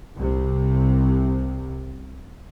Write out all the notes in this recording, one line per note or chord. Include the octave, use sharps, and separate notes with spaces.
C2 C3